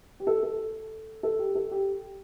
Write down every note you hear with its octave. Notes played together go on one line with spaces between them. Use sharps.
G4
A4
A4
A4
G4
A4
G4